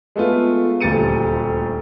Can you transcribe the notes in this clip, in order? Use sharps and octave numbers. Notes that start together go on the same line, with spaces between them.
G#3 A3 B3 F4
D#1 D2 G4 A6 C#7 D#7